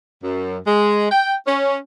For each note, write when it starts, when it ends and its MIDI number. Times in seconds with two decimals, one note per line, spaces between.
0.23 0.57 42
0.65 1.05 56
1.11 1.34 79
1.46 1.76 61